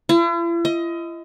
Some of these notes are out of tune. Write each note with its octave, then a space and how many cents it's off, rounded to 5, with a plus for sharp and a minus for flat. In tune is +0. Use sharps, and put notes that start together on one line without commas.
E4 +45
D#5 +25